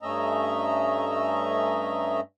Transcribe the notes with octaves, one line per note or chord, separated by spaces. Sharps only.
G2 A3 C#4 D#5 E5 A#5